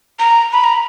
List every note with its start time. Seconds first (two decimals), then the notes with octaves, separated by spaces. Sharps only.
0.19 A#5
0.53 B5
0.64 A#5